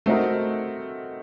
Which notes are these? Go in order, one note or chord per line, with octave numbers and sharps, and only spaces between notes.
A3 C4 D#4 F#4 A#4